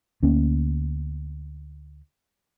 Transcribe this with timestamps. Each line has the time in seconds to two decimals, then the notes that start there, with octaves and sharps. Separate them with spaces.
0.23 D2 A#3 C#4